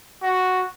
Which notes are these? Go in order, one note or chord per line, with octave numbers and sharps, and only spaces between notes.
F#4